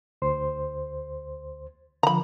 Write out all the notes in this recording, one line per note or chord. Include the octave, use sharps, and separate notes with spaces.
D2 C5 C6
D3 F3 A#5 B5